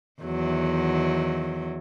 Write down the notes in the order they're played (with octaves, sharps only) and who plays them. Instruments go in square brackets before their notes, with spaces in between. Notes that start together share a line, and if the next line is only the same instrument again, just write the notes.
[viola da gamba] E2 D#3 F#3